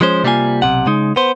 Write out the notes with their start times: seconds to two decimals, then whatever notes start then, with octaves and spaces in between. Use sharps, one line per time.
0.01 F3 G#3 C#4 C5
0.24 C3 G3 A#3 E4 F4 G#5
0.62 B1 G#2 C3 F#5
0.86 C#3 G#3 D#4
1.16 B3 C5